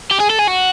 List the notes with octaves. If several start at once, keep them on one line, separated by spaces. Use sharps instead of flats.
G4
G#4
A4
G#4
F#4